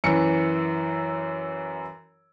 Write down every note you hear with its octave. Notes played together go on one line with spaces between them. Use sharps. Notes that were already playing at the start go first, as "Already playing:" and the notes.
F#2 E3 C#7